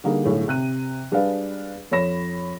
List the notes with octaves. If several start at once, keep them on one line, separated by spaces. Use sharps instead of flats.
D3 G3 A#3 D#4 G#4
B1 A2 D3 G#3
C3 F#6 D#7
G3 G#3 D4 B4 D5 F5
F2 C#5 B5 A#6 E7